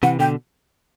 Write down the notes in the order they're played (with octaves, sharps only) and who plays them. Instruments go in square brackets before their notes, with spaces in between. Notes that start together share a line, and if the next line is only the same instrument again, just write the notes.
[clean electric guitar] C3 E3 [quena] F#5
[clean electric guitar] B2 D3 [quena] G5